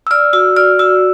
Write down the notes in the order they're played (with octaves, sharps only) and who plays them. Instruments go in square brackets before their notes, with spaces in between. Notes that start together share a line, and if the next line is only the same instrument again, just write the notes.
[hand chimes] E6
[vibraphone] D5 [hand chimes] F6
[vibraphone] F#4 [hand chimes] E6
[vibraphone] D5 [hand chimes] F6
[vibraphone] F#4 [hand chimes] E6